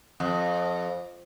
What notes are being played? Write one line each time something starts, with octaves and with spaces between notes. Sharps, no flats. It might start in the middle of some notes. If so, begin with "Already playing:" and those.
F2